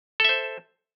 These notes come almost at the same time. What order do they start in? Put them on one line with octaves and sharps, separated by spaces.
A4 E5 C5